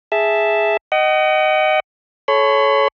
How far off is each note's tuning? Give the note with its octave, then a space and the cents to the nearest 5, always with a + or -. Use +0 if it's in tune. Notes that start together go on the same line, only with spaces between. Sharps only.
G#4 +0 E5 +0 A5 +0
D#5 -5 F#5 +40
A4 -30 C#5 +0 B5 +45